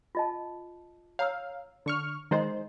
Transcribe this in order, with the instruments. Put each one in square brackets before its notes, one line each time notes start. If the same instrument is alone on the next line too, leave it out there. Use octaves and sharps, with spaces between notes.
[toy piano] F4 D#5 A5
[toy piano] C#5 A#5 E6 [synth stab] F5
[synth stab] D3 C#6 F6
[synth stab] D#3 G#3 C5 [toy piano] E4 D#5 C6